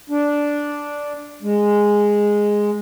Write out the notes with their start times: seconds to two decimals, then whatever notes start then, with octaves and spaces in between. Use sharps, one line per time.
0.10 D4
1.42 G#3